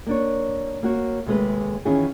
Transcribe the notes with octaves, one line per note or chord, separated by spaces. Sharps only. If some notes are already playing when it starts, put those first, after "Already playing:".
A#3 D4 C#5
A#3 F#4 C#5
D#2 C3 G#3 A3 G#4 B4
D#3 E3 C#4 F4 G#4